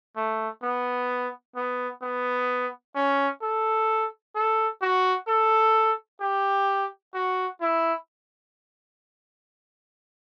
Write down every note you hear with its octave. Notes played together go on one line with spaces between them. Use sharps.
A3
B3
B3
B3
C#4
A4
A4
F#4
A4
G4
F#4
E4